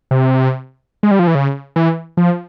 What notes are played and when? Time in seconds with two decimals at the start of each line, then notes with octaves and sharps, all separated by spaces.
0.11 C3
1.03 G#3
1.11 G3
1.19 F3
1.27 E3
1.35 C#3
1.76 E3
2.17 F3